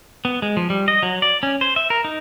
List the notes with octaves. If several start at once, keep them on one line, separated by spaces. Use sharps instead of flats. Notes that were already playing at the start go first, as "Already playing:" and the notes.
B3
G#3
F3
G3
D#5
F#3
D5
C#4
C5
E5
A#4
D#4